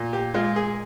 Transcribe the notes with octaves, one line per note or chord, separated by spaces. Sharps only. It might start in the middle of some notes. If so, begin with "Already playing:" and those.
Already playing: A#2
G4
G#3 F4
G#4